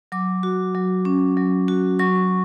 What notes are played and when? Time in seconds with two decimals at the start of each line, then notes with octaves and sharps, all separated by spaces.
0.12 F#3 D6
0.43 F#4
0.75 F#3
1.05 C#4
1.37 F#3
1.68 F#4
1.99 F#3 C#6